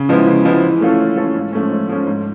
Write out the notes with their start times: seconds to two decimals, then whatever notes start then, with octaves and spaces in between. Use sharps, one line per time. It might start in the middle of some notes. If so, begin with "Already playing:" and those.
Already playing: C#3
0.09 F3 G#3 B3 E4
0.27 C#3
0.45 F3 G#3 B3 E4
0.63 E3
0.81 A3 C#4 F4 A4
0.99 E3
1.17 A3 C#4 F4 A4
1.35 G#2
1.53 F3 A3 C#4
1.71 G#2
1.89 F3 A3 C#4
2.07 G#2